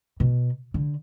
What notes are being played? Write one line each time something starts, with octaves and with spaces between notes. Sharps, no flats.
B2
D3